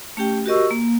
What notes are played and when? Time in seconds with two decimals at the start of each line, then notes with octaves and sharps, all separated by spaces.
0.17 A3 C#4 G4 G5
0.46 F#4 G4 A#4 D#5 C#6 E6
0.71 A#3